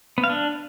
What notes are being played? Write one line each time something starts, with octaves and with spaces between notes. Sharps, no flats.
B3
F5
D4